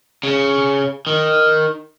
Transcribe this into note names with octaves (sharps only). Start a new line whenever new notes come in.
C#3
D#3